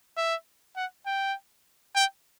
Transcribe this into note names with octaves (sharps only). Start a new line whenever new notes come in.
E5
F#5
G5
G5